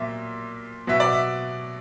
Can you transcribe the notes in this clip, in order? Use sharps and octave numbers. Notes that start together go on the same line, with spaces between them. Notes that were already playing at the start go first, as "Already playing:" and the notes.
Already playing: A#2 F#3 A#3 E5
B2 F#3 B3 E5
D5
E5